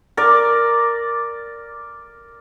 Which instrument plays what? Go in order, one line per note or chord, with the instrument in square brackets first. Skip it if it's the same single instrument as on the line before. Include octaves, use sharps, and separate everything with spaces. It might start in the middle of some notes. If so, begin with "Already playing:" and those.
[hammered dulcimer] A#4 D5